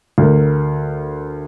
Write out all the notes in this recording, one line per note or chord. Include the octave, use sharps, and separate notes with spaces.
D2 A#4